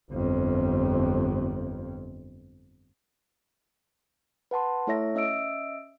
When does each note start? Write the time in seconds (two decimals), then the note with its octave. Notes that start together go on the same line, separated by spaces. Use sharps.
0.11 G1 F2
4.51 B4 F#5 A5 C6
4.87 A3 E4 A4 C#5 E5 A#6
5.15 C#4 D#5 E5 E6 D7